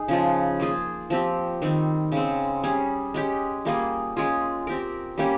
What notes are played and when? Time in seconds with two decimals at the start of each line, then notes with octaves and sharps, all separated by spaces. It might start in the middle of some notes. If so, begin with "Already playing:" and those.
Already playing: D#4 G#4
0.08 C#3 F3 G#3
0.60 A#3 F4 G#4 C5
1.10 F3 C4 G4
1.62 D#3 G3 C4
2.12 C#3 G#3 C4
2.63 G3 C#4 G#4
3.14 G#3 C#4 G4
3.65 G3 A#3 F4 G#4
4.17 G#3 C#4 F4 G#4
4.67 C4 G4 A#4
5.18 G3 A#3 C#4 G4